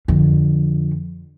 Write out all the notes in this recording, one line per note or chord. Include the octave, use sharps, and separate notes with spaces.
F2 D3